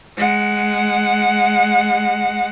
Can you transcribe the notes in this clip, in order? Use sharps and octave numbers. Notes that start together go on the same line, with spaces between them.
G#3 F#5